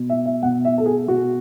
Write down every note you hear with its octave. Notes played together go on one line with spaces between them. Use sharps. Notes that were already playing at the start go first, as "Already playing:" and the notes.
Already playing: B2
E5
E5
B2 F#5
E5
A4
G#4
B2 F#4